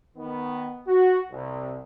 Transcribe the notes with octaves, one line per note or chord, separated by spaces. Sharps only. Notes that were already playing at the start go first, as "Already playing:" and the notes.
D#3 B3
F#4
C2